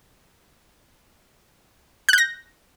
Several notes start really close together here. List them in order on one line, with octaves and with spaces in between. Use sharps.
F#6 G6 A#6